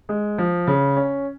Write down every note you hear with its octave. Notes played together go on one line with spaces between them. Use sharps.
G#3
F3
C#3
C#4